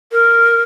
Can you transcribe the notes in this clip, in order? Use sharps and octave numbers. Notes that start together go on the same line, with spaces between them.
A#4